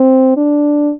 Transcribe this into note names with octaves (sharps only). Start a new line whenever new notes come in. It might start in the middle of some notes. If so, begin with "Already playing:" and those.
Already playing: C4
D4